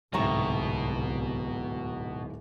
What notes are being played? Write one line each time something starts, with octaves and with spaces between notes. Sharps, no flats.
D1 C2 G#2 B2 E5 G5 A#5 C#6